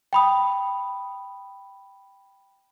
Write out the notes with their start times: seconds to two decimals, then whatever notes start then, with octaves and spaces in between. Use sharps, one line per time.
0.13 G5 B5 D#6